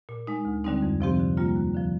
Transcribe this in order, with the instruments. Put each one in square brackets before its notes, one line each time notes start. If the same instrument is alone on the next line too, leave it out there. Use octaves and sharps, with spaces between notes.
[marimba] A#2
G#3 D#4
D2
D3 G3 C4 D#4
F2
C3 F3 C4 G4
D3
G3 A#3 F4
D#2
D3 F3